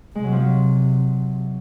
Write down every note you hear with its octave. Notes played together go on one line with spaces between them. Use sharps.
C3 G#3
F#3
F3
F#3